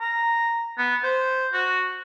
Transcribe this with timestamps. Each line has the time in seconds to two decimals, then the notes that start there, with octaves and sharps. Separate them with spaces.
0.01 A#5
0.78 B3
1.03 C5
1.53 F#4